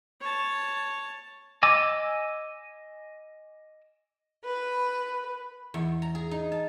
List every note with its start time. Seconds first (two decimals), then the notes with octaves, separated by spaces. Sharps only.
0.21 C#5 A5
1.63 D#5 G#5 D6 E6
4.43 B4
5.74 E2
6.02 A#5
6.15 G#4
6.31 D#4
6.52 A5